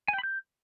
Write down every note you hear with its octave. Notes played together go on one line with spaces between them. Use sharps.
G#5
G5
B5
G6